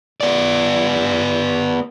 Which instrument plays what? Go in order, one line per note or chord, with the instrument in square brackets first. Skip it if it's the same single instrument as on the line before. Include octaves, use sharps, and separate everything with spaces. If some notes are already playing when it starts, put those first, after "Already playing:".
[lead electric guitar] B3 D5